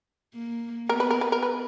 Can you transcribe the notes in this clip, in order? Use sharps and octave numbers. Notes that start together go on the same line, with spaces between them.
A#3
B3 A#4
B4
A#4
B4
A#4
B4